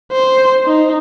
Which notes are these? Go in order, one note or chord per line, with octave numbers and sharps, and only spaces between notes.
C5
D#4